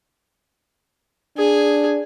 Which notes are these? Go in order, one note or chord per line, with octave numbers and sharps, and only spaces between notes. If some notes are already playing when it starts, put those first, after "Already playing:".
D4 G#4